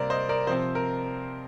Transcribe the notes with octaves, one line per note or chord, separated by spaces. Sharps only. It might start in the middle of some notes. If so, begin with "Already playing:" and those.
Already playing: C3 G3 A#3 A#4 C5 D5
C5 D#5
A#4 D5
C3 F3 C4 C5
A#4